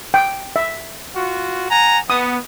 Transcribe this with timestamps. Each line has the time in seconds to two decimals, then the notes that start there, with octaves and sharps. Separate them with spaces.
0.14 G5
0.56 E5
1.15 F4 F#4
1.70 F#5 G#5 A#5
2.10 B3 D#6